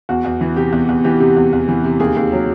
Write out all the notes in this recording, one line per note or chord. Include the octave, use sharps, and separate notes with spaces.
E2 F#4
E2
E3
C3 G4
E2
E2
E3 G4
C3
E2
E2
E3
C3
D#2 G#4
D#2
F#3